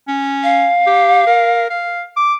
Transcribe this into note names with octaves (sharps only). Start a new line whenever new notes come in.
C#4
F5
G4
A#4
F5
D6